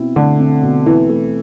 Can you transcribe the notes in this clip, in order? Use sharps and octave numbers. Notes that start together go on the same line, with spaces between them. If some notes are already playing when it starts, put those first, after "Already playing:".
Already playing: B2 C4 E4
D3 A3
C4
B2
E3 E4
A3